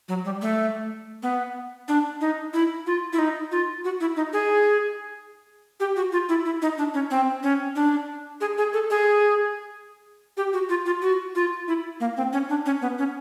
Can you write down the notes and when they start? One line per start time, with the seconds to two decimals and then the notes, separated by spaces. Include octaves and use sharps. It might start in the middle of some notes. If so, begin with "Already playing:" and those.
0.08 F#3
0.25 G3
0.42 A3
1.23 B3
1.88 D4
2.21 D#4
2.53 E4
2.87 F4
3.13 E4
3.19 D#4
3.51 F4
3.85 F#4
4.01 E4
4.16 D#4
4.33 G#4
5.80 G4
5.96 F#4
6.12 F4
6.29 E4
6.45 E4
6.62 D#4
6.78 D4
6.94 C#4
7.11 C4
7.43 C#4
7.76 D4
8.41 G#4
8.58 G#4
8.73 A4
8.90 G#4
10.37 G4
10.53 F#4
10.69 F4
10.86 F4
11.02 F#4
11.35 F4
11.68 E4
12.00 A#3
12.17 C4
12.33 C#4
12.49 D4
12.66 C#4
12.82 B3
12.98 C#4